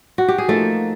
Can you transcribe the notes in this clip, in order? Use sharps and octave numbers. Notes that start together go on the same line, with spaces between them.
F#4
G4
G#4
F3 A3 A#3 D#4 A4